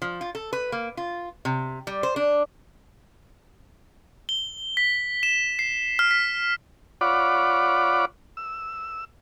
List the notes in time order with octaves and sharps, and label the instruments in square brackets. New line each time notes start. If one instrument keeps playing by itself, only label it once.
[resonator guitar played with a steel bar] F3
F4
A4
B4
A#3
F4
C3
G3
C5
D4
[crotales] G7
B6
E7
C7
F6
B6
[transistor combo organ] F4 C#5 D5 F#5 B5 D6
E6